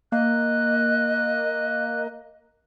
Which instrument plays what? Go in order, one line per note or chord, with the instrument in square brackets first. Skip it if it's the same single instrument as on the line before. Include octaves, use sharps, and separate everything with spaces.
[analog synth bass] A#3 [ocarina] D#5 [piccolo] F#6